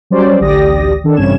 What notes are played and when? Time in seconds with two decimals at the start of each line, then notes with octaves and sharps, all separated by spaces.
0.10 F#3 G3 C#4 C5 D5
0.41 A1 D2 G4 D5 D#6 A#6
1.04 D#3 D4 A4
1.16 A1 G2 C3 C#4 G#6 E7